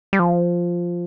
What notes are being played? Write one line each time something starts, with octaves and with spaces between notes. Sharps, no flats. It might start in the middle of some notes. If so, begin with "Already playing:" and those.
G3
F3